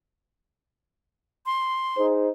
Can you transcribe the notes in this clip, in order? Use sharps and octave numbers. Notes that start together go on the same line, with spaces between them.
C6
D#4 G#4 C5